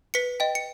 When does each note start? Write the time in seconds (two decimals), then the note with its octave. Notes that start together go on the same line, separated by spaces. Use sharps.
0.14 B4 B6 C#7
0.40 D#5 G5
0.55 C#7